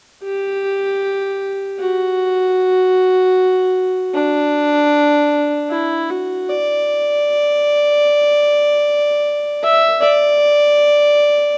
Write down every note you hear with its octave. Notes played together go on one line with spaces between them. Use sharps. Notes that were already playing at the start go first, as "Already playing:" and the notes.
G4
F#4
D4
E4
F#4
D5
E5
D5